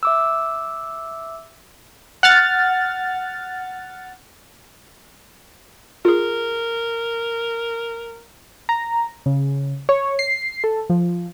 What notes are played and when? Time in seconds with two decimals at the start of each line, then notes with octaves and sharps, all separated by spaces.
0.03 E5 D6 E6
2.23 F#5 F6 A6
6.05 F4 G#4 A#4
8.69 A#5
9.26 C#3
9.89 C#5
10.19 C7
10.64 A4
10.90 F3